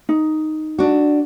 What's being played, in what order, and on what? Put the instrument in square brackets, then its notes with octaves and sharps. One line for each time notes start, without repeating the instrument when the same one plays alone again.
[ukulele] D#4
[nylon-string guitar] D4 F#4